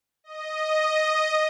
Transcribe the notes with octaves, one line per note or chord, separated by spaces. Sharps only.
D#5